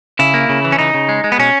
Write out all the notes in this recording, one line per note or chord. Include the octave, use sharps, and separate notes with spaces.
C#3 E4
A#3
C#3
E3
C#4
C#3 D#4
C#3
G#3
G#3
B3
B2 C#4